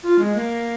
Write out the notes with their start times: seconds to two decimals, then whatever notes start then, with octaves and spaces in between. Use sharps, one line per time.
0.03 F4
0.19 G#3
0.35 A#3